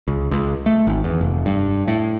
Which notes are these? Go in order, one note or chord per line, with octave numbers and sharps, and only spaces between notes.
C#2
C#2
A3
G#1
E2
F1
G2
A2